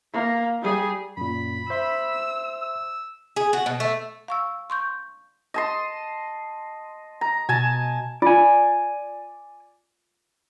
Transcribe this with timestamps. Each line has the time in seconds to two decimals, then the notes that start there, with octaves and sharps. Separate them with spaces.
0.13 A#3
0.62 G3 G#4
1.17 F#2 A#2 B5
1.70 C5 E5 C6 E6
2.61 E6
3.36 G#4
3.53 F#4
3.66 B2
3.80 A3
4.28 F5 C#6 E6
4.70 C6 C#6 G6
5.54 D#5 A5 C6
7.21 A#5
7.49 B2 G#5 A5
8.22 F4 D5 G#5